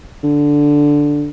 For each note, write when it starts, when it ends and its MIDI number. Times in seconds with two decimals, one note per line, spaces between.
0.23 1.30 50